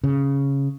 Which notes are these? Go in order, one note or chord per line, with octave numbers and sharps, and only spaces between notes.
C#3